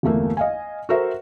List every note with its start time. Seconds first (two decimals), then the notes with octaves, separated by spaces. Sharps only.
0.03 G1 E2 A3 A#3
0.37 D#5 F5 G#5
0.89 F#4 A4 A#4 C5 E5